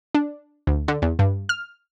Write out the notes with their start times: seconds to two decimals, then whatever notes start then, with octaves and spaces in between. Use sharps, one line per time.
0.15 D4
0.67 D2
0.88 D3
1.02 E2
1.19 G2
1.49 F6